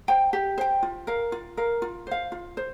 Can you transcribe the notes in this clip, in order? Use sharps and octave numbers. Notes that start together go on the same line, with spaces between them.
C5 G5
G4
C5 G5
F4
A#4 F5
F4
A#4 F5
F4
C5 F5
F4
C5